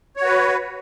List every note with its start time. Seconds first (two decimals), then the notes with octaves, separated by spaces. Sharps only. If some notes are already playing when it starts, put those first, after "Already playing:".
0.16 C#5
0.21 F#4
0.26 B4